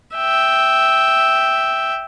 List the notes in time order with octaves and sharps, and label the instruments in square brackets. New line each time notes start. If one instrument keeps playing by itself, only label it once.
[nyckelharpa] E5 G5